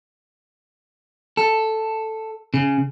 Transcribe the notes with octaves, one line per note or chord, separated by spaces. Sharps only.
A4
C#3